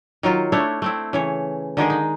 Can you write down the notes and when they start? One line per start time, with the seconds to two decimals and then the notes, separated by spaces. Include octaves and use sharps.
0.23 D#3 F#3 F4
0.52 A3 D4 E4 C#5
0.82 A3 C4 E4
1.13 C#3 E3 C#5
1.77 D3 D#3 G#3 G#4
1.90 D#4